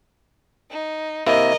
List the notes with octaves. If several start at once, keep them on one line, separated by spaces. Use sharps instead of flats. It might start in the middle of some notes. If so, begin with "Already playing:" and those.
D#4
C3 A#3 E4 A#4 D#5